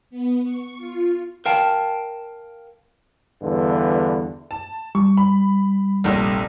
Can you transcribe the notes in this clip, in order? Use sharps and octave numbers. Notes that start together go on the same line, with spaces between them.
B3
C#6
F4
A#4 F5 G5 A5
E2 G2 D3
A5
G3 C#6
B5
F1 A#1 C#5